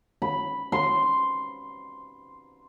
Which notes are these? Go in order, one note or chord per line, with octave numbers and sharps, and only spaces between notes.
B5
C6